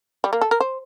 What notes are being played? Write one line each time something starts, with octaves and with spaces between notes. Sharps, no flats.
G3
A#3
A4
A#4
C5